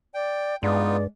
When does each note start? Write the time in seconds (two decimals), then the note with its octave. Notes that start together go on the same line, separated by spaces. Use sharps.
0.14 D5 G5
0.63 G2 G#3 B3 D#4 F4 D5